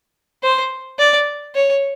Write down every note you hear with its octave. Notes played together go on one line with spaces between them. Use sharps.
C5
D5
C#5